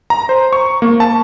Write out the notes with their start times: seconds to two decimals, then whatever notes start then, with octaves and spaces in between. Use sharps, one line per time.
0.10 A#5
0.29 C5
0.53 C#6
0.82 A#3
1.00 A5